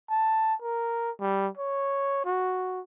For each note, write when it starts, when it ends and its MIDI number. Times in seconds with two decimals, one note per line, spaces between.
0.10 0.55 81
0.62 1.11 70
1.20 1.48 55
1.57 2.22 73
2.25 2.80 66